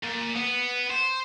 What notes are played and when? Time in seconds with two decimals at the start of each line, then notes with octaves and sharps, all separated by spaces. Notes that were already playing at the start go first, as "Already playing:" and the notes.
0.04 A#2
0.36 B3
0.90 C5